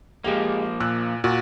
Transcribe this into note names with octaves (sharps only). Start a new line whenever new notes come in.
F3 G#3 A#3 G4 F5
A#2 E6 F#6
A#2 F#4